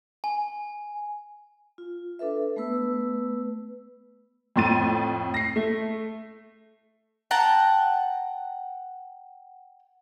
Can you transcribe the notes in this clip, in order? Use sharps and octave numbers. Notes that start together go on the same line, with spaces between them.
G#5
F4
D4 A4 B4 E5
A3 B3 B4 E6
F2 A2 C6 A6 D#7
A#6 C7
A3
F#5 G5 A5 A#5